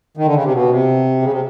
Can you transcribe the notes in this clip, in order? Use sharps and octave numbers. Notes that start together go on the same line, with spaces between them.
D#3
D3
C#3
C3
B2
C3
C#3
C3